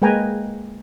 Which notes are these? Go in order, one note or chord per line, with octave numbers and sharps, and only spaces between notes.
G#3 A#3 B4 G5 G#5 A#5